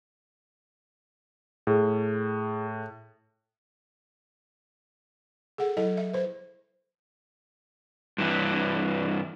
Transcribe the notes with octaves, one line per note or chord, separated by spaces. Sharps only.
A2 G#4
G#4 A4 F#5
F#3 E4 A4 D#5
E5
B4 C5
G2 E3